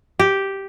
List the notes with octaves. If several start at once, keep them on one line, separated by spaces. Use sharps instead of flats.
G4